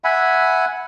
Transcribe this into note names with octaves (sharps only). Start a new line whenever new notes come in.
E5 F#5 G#5 B5